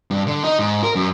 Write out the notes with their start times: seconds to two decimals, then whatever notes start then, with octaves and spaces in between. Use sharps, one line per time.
0.11 G2
0.27 D3
0.43 D#4
0.59 G#2
0.84 A#4
0.95 F#2